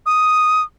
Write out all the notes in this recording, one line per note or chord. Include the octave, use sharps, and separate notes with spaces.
D#6